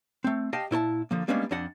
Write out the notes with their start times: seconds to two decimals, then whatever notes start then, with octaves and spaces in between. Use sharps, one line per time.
0.24 A3 C4
0.53 G4 D#5 F5 G5 A5
0.71 A#2 E4 C5 A5
1.11 D3 F3 A#3
1.28 G3 G#3 A#3 B3 C#4 D4
1.51 F2 D4 D#5 F#5